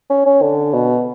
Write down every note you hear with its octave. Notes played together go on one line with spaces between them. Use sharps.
C#4
C#4
D3
B2